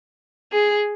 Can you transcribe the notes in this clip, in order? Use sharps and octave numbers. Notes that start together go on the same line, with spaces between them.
G#4